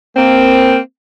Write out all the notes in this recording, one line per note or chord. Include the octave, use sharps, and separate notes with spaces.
A#3 C4